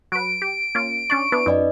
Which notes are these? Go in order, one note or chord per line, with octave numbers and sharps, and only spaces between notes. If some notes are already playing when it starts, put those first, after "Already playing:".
F#3 B4 D7
G4
A#3 C#4 F4
C#4 D4 D5 C#6
B3 D4 E4 B4
F#2 D#4 D5 D#5